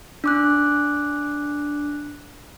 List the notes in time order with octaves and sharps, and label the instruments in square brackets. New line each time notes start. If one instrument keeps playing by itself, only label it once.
[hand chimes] D4 D6 F#6